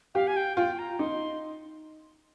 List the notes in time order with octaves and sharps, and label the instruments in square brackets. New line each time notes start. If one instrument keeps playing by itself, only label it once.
[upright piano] G4 [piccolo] F5
[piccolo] G#5
G5
[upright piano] F4 [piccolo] G5
[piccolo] A#5
[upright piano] D#4 [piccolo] C6